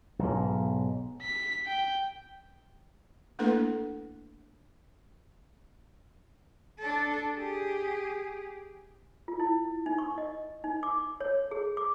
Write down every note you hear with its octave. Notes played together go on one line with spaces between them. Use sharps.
B1 G#2
B6
G5
A3 A#3 D4 E4 A4 B4
D4 A4
G4 G#4
F4
E4
D#4
C#6
D#5
D#4
D6
C#5
G#4
D6